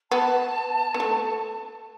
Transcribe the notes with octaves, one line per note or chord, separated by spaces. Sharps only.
B3 A5
B3
A3